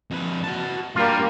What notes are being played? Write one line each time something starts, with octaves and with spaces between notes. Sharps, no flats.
F2 B4
F#4 A5
G2 G3 A#3 F4